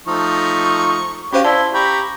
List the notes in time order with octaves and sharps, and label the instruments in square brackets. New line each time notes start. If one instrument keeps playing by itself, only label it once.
[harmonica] F3 A3 D#4 [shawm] C#6
[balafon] C#4 C5 F5 [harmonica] F#4 G4 C#5
[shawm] E4 [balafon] D5 A5 [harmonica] C6
[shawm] G4 [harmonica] A#5 B5 C#6